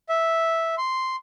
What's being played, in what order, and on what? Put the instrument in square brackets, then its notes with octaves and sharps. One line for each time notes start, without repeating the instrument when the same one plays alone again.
[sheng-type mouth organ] E5
C6